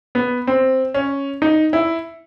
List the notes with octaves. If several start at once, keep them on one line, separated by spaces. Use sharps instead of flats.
B3
C4
C#4
D#4
E4